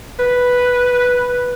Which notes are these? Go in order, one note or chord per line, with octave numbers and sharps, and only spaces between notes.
B4